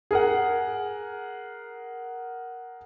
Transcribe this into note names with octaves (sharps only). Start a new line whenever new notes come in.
G#4 A#4 F#5